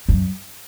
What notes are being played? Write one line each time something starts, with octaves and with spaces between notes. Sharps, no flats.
F#2